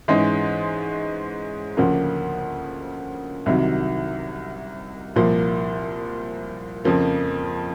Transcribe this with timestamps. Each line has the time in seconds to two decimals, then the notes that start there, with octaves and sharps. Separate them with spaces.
0.08 G#2 E3 G#3 C#4
1.77 D2 C#3 F3 A#3 C#4
3.46 C2 C3 D#3 F#3
5.16 C2 A#2 F3 A#3
6.85 F2 C#3 F3 A#3